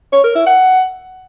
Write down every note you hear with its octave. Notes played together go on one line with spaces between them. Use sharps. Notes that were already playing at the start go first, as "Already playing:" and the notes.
C#5
A#4
E4
F#5